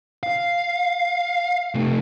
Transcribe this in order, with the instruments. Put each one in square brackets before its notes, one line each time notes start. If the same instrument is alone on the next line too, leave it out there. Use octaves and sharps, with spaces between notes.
[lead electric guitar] F5
C3 A3